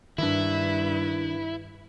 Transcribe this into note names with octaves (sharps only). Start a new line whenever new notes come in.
G2 D#3 D4 E4 B4